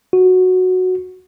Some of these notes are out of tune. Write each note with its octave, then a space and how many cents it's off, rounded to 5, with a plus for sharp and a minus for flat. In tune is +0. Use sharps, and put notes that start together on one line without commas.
F#4 -5